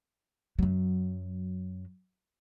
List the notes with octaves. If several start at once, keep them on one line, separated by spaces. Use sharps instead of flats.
F#2 F#3